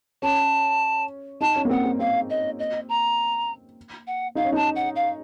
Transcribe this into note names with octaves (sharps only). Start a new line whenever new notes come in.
C#4 A5
D#4 A5
C#4
A#3
C4 F#5
C4
C4 F5
D#5
D#5
A#5
F#5
D#4 F5
C#4
D#4 A5
F#5
F5